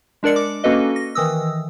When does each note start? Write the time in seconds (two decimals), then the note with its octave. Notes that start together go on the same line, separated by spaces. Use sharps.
0.23 G#3 D4 A#4 D5 C#7
0.36 D6
0.64 A#3 C#4 F#4 A4 B4 D#5
0.96 A#6
1.15 D#3 E3 D#6 E6